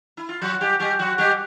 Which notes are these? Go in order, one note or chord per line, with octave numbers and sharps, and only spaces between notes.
E4
F4
F#3 F#4
G3 G4
G3 G4
F#3 F#4
G3 G4